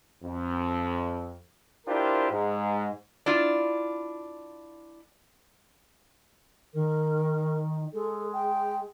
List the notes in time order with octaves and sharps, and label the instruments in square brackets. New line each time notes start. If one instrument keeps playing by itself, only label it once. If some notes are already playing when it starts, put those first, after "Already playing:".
[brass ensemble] F2
D4 E4 F4 G4 A#4 C5
G#2
[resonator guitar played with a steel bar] D4 E4 F4
[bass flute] D#3 [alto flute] A#4
[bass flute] G#3 [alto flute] A4
[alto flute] G5